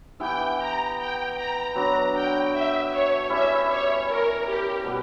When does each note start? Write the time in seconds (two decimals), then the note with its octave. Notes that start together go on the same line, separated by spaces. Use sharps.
0.20 E3 B3 E4 G4 G5
0.59 A#5
0.98 G5
1.36 A#5
1.75 F#3 B3 D4 A#5
2.14 G5
2.52 E5
2.91 C#5
3.29 G3 C#4 E4 E5
3.68 C#5
4.08 A#4
4.46 G4
4.84 B2 G3 B3